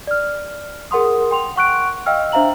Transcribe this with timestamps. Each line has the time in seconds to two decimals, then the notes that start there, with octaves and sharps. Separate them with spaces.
0.07 D5 F6
0.91 G#4 A#4 F#5 C6 D#6
1.31 G5 C6 F7
1.56 F#5 C#6 F#6 D7
2.06 D#5 F5 G5 E6 F6
2.32 D4 C5 E5 F5 A#5 F#7